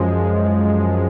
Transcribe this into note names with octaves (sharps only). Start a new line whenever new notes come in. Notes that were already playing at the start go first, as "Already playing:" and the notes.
Already playing: F#2 F3 G#3